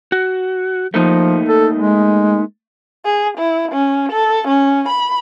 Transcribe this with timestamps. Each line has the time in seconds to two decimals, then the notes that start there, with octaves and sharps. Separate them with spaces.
0.12 F#4
0.94 F3 A3 A#3 D#4
1.48 A4
1.77 G#3
3.05 G#4
3.38 E4
3.72 C#4
4.12 A4
4.48 C#4
4.89 B5